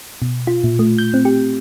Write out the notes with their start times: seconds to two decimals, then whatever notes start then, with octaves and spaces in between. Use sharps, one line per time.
0.22 B2
0.47 F4
0.64 A#2
0.79 A3
0.98 G6
1.14 C4
1.25 G4